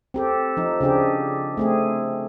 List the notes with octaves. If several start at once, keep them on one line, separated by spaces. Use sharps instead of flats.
C4 G4 A4
F3 D#4
C#3 D4 G4 G#4
A3 C4 G#4